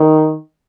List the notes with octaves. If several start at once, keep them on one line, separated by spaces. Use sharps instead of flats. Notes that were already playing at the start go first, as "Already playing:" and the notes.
Already playing: D#3